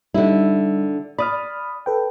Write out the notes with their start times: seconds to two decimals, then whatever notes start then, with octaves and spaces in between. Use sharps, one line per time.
0.14 D3 G3 D#4 E4
1.18 D5 B5 D#6 F6
1.86 A4 B4 G5